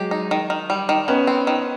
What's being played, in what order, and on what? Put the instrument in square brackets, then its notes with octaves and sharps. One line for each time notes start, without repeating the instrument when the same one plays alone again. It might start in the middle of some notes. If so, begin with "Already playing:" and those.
Already playing: [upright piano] F#3 G#3 [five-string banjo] G4
[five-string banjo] D#4
D#3
D#3
G3
D#3
[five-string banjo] D#3 [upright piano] B3 C#4
[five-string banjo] C4
D#3